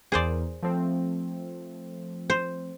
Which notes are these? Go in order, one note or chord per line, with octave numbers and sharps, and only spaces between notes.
E2 G#4 A#4 C5 D5
F3 A3 C4
C5